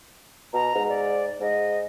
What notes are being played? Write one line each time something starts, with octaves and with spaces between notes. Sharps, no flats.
B2 A#5
G#2
D5
G#2 D#5